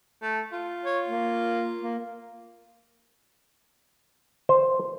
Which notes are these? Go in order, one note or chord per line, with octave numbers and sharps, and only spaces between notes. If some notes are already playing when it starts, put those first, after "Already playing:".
A3
F4
C#5
A#3
A#3
C5